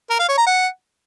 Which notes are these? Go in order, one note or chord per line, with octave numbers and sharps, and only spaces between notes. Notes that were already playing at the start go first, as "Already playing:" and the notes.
A#4
F5
C#5
A#5
F#5